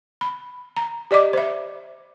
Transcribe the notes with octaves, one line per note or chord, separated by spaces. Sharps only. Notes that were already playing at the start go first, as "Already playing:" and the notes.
B5
A#5
G4 D5 D#5 D6
C5 E5